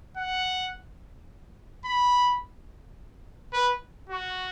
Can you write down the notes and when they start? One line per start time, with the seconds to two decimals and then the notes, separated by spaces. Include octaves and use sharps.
0.17 F#5
1.85 B5
3.53 B4
4.09 F#4